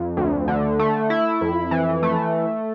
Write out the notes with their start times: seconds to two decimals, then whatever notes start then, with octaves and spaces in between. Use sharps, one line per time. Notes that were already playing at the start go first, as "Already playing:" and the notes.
Already playing: F2
0.17 D2
0.48 D3
0.79 A3
1.10 E4
1.41 F2
1.71 E3
2.03 A3